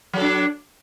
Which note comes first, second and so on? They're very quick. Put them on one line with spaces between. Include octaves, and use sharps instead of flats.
F#3 A4 D4